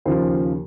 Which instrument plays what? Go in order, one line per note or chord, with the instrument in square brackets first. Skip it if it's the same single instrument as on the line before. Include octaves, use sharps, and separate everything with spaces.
[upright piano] D#2 C#3 F3 C5